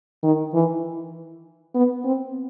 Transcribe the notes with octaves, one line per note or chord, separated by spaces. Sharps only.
D#3
E3
B3
C4